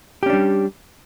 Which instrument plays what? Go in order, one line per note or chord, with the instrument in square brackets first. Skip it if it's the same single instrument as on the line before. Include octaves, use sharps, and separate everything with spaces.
[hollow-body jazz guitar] G4
C#4
D4
G3